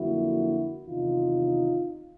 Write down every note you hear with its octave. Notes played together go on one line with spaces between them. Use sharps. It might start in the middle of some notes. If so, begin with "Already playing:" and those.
Already playing: F2 D3 F#3 A#3 E4 F#4
E2 C3 D#3 D#4 F4